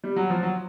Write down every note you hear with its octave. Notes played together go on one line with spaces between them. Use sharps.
G3
F#3
F3
F#3